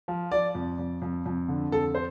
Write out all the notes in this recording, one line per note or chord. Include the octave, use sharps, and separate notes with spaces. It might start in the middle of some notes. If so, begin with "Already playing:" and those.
F3
F3 D5
F2
F2
F2
F2
D3
F2 A4
C5